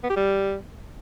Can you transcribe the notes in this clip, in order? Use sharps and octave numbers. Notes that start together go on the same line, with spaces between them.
B3
G4
G3